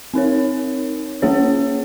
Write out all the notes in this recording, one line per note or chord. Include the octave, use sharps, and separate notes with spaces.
C4 D#4 A#4 C#5
A#3 C#4 G#4 C#5